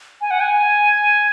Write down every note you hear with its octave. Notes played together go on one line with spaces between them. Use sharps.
G#5
F#5
G#5